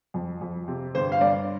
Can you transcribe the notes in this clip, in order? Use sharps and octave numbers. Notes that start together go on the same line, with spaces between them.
F2
F2
C3
G1 C5
F5
G2 D5